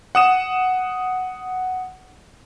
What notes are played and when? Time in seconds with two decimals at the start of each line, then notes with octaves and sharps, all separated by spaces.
0.15 F#5 D#6 E7